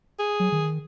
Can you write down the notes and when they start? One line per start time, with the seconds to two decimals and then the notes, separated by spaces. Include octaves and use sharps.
0.19 G#4
0.40 F#3
0.52 D#3